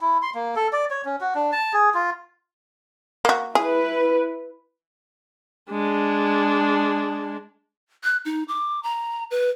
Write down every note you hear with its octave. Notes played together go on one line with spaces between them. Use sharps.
E4
C6
A#3
A4
D5
C#5
C#4
F#4
D4
A5
G#4
F4
A#3 F#4
E4 G#4 B4
G#3 D4
F#6
D#4
D6
A#5
B4